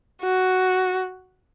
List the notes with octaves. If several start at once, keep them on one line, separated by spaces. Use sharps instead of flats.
F#4